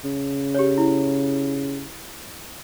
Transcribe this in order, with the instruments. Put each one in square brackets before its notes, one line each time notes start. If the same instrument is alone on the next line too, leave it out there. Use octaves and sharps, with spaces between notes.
[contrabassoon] C#3
[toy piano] G4 C#5
E4